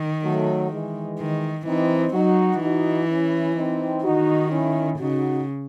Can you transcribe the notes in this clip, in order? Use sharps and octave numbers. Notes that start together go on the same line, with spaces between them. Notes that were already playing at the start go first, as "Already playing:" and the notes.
Already playing: D#3
F#3 A3
E3 G#3
D#3
E3 C4 D#4
F#3 D#4 F#4
E3 D#4 F#4
C#4 E4
C4 D#4
D#3 D#4 F#4
C#4 E4
C#3 D#4 F#4